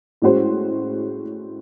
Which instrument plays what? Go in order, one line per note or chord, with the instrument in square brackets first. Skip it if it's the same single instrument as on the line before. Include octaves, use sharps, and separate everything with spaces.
[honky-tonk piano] A2 G#3 C#4 F#4 C5